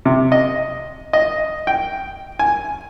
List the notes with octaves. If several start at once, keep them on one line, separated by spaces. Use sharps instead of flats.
C3
D#5
D#5
G5
G#5